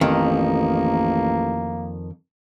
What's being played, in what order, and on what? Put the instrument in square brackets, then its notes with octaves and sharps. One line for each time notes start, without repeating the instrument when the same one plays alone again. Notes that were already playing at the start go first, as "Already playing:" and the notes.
[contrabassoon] A1 [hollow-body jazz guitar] F2 D#3 [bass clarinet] A#3